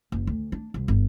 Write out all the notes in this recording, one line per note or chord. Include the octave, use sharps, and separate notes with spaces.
F#1
D2
D4
C2
G1